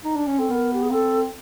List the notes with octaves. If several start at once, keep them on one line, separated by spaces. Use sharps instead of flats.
D#4
D4
C#4
C4 A4
B3 A#4
G4
G#4
C4 A4